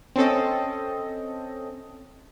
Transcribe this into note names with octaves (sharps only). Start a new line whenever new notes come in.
C4 C#4 A4 D#5